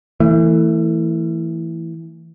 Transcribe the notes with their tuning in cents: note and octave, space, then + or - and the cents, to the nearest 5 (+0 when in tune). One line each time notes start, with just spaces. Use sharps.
E3 +0 A3 +35